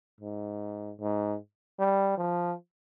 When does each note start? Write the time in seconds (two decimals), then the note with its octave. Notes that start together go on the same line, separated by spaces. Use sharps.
0.21 G#2
1.01 G#2
1.79 G3
2.18 F3